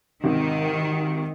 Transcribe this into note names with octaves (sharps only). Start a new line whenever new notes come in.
G#1 C3 D#3